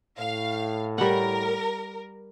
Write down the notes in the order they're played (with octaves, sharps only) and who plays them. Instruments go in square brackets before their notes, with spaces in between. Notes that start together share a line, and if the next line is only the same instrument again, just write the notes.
[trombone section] A2 [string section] F5
[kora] G3 F#5 [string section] A#4